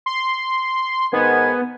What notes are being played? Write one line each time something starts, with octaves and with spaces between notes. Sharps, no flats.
C6
G#2 D#3 B3 G#5